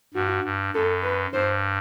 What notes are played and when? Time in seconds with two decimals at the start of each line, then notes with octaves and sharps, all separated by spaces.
0.14 G2 F#4
0.44 G2
0.74 F#2 A4
1.03 B4
1.32 G2 C5